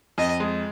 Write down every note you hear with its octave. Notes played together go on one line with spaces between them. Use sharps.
F2 D#5
G#3